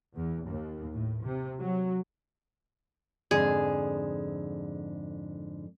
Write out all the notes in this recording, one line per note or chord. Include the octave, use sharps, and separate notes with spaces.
E2
D#2
A2
C3
F#3
F2 G#2 D3 G#4